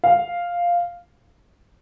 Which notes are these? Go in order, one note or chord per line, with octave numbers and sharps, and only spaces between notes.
F5